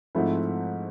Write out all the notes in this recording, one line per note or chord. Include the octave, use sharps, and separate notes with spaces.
G#2 F3 A3 C4 E4